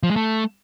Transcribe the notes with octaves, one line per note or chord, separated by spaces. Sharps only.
F3
G#3
A3